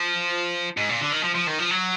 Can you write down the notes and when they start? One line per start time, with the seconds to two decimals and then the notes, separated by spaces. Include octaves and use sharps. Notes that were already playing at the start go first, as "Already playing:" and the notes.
Already playing: F3
0.77 G#2
0.89 A#2
1.01 D3
1.12 D#3
1.24 F3
1.35 F3
1.47 D#3
1.59 F3
1.71 F#3